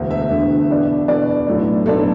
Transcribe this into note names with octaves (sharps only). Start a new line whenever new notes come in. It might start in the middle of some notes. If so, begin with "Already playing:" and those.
Already playing: E1 D2 D3
E5
E1 D2 D3
E2 B2 B3 D4
E2 B2 B3 D4 D5
B1 A2 F#3 A3 D4
B1 A2 F#3 A3 D4 A4